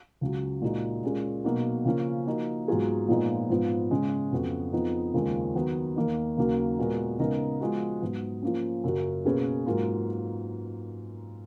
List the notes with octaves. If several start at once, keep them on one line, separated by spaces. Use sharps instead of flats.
C#2 C#3 F#3
A#2 G#3 D#4 F#4
A#2 G#3 C#4 G#4
B2 F#3 A#3 D#4 F#4
C#3 F3 A#3 C#4
F3 A#3 D#4 F#4
G#2 F#3 B3 F4 G#4
A#2 F3 G#3 B3 D#4
G#2 F3 B3 F4
C#3 G#3 C#4
F2 C#3 F#3 B3 F#4
F2 F3 B3 D#4
D#2 C#3 F3 G#3 C#4
D#3 F#3 B3
D#2 D#3 A#3 D#4
D#2 C#3 F#3 A#3
A#2 G#3 B3 F#4 A#4
C#3 G#3 B3 D#4 A#4
F3 G#3 B3 F#4
G#2 F#3 B3
F3 A#3 C#4
F#2 C#3 F#3 C#4 F#4
B2 A#3 C#4 G#4 B4
G#2 F#3 A#3 F4 A#4